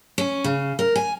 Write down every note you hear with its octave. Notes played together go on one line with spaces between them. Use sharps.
C#4
C#3
A#4
G#5